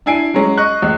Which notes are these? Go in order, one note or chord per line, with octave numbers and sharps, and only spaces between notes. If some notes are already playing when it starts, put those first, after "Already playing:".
D4 E4 G#5 C7 D7
F#3 G#3 C#4
D#5 C#6 F#6
C#2